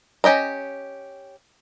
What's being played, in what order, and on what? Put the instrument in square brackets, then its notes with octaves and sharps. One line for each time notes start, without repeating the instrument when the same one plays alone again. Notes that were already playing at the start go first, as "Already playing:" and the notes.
[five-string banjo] C#4 G4 D#5 A#5